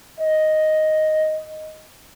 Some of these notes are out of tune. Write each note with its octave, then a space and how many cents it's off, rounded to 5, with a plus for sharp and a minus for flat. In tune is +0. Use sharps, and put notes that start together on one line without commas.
D#5 +0